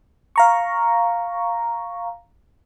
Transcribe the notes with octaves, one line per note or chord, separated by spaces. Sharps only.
F5 A#5 C#6